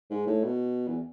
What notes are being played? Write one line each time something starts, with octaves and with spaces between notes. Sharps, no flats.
G#2
A2
B2
E2